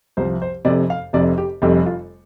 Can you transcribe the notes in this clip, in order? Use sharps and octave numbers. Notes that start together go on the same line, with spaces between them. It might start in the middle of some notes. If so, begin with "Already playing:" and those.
C2 C3 F3 C5
C5
F1 F2 C3 D5
F5
F1 F2 C3 D5
G4
F1 F2 C3 G3 G4
F4